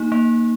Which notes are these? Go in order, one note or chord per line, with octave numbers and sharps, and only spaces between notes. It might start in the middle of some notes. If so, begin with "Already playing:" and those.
Already playing: A#3 D#4
A#3